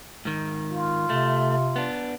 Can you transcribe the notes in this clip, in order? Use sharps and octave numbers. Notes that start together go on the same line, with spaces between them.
G#2 D#3
F4
C3 A3
B3 D4